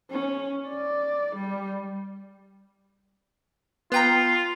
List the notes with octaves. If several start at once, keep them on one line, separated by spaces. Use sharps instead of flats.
C#4
D5
G3
B3 F4 G5 A#5